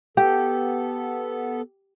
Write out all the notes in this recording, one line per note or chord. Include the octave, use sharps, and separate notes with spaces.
B3 G4 A4